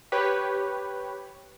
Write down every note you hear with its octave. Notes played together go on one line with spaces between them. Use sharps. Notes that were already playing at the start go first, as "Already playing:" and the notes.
G4 B4 C#5